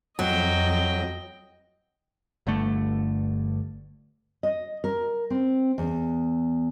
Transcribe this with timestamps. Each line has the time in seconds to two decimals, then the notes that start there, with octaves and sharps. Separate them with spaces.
0.19 F2 F#3 D#5 G5
2.47 G1 G2 D3 A3
4.43 D#5
4.84 A#4
5.30 C4
5.78 E2